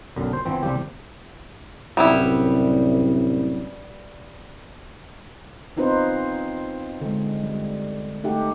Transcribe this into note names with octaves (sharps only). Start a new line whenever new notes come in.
B1 F#2 D3
C5
G1 E3 F3 C4
C2 G3 C4 G4
C2 F#2 A2 G3 B3 E4
B3 C4 D#4 F4 B4 C5
D3 G#3
G3
A3 D#4 G4 F#5